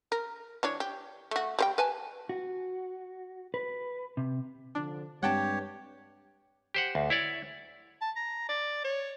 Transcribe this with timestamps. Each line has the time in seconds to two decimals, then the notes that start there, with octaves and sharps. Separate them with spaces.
0.12 A#4
0.63 E3 D4 C#5
0.80 G4
1.31 A3 F#4
1.59 G3 B4 G5
1.78 B4 G#5 A5
2.29 F#4
3.54 B4
4.17 C3
4.75 D3 F3 D4
5.23 G2 G#3 C4 G4 C#5 F#5 G5 A5
6.74 G4 C5 F#5
6.95 D2
7.10 E4 C#5 D5
8.01 A5
8.16 A#5
8.49 D5
8.84 C#5